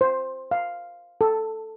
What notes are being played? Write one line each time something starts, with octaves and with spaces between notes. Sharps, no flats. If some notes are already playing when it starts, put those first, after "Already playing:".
C5
F5
A4